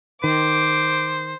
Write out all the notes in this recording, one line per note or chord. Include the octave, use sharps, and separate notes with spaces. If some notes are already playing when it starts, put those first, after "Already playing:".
D#3 C5 D6